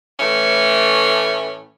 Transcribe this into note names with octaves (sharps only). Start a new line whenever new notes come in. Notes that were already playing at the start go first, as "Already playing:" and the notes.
A2 E3 A3 C#4